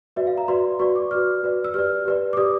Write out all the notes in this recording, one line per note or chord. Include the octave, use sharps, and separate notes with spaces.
F#4 B4 D5 E5
F5
A#5
F#4 B4 D5 C6
F#4 B4 D5 C#6
D6
F#4 B4 D5 F6
F#4 B4 D5
E6
G4 B4 D5 F6
G4 B4 D5
D6
G4 B4 D5 D#6